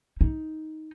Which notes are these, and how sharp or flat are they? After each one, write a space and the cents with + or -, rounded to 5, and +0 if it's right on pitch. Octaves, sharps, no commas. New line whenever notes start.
D#4 +10